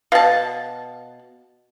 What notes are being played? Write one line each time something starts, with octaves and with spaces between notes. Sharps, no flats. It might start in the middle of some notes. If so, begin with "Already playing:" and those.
B2 F5 A5